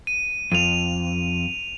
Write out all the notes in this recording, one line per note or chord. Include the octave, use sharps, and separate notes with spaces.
D#7
F2 D#7 F7